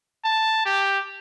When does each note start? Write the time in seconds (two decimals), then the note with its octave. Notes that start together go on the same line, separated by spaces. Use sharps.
0.24 A5
0.65 G4